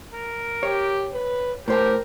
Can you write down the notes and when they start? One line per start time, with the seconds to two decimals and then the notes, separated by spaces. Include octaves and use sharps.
0.13 A#4
0.63 G4 C#5
1.13 B4
1.68 A2 G4 A#4 C5 A5